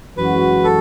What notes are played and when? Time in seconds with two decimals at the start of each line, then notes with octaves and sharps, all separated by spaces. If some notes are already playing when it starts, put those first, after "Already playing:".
0.17 F#2 E3 G#3 C#4 F#4 B4
0.64 A4